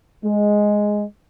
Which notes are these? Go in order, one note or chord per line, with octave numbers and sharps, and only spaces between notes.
G#3